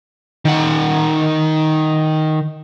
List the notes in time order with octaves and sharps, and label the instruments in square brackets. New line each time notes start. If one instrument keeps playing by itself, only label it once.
[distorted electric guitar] D#3 F#5